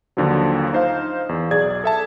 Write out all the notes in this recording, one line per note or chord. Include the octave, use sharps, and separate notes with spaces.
D#2 D3 F3 F#3
D#4 C5 F5
E2
B1 G#4 D5 G#6 A6
A4 E5 A5